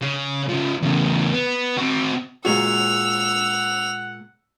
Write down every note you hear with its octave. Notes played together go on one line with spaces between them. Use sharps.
C#3
C#3 F3
E2 C#3
B3
C4 F#4
A#2 G#3 F#4 F#5 E6 F7